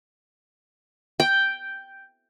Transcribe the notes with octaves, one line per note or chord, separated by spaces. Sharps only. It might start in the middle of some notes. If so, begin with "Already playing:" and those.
G5